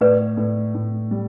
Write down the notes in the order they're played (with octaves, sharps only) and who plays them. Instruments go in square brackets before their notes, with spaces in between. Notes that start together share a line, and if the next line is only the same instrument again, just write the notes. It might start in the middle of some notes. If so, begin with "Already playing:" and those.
[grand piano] A2 [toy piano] B4 D5
[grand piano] A2
A2
G3